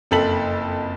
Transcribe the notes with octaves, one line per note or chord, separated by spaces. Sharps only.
F#1 F2 A4 B6 F#7